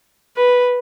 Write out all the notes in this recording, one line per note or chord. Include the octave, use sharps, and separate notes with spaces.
B4